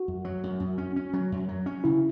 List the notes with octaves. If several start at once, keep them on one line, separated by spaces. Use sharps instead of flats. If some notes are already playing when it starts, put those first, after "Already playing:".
Already playing: F#4
F#2
F#3
F#2
F#2
C#4
C#4
F#3
F#2
F#3
C#4
C#3 E4